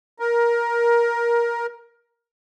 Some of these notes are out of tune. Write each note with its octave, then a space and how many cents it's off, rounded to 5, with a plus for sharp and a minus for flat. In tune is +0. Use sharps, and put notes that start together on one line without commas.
A#4 +15